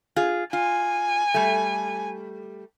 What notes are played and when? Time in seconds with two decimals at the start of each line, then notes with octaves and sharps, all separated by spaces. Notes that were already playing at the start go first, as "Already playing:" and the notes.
0.16 F4 G#4
0.53 F4 G#5
1.34 G3 A3